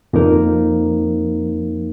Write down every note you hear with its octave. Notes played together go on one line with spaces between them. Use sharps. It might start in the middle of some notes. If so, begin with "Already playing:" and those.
F2 F3 A#3 D#4 A#4